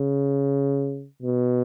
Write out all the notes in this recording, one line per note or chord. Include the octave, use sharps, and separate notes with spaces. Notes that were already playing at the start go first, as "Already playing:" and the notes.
Already playing: C#3
B2